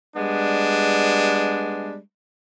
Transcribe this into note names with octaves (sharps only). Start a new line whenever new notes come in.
G3 G#3 B3 D4